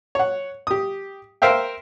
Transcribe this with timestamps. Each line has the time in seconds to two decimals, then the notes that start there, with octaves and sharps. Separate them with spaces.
0.15 C#5 F#5
0.67 G4 D#6
1.42 A#4 C5 E5 F5 G5